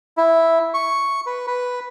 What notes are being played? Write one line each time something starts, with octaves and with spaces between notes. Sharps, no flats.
E4
C#6
B4
B4